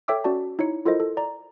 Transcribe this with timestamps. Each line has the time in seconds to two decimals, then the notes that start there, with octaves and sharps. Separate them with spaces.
0.08 A4 C#5 E5 G5 D6 E6
0.24 C#4 F#4 D5 A5
0.59 D#4 E4 C#5 C#7
0.86 E4 F4 A4 A#4 C5 D#5
1.00 A4
1.17 D5 A#5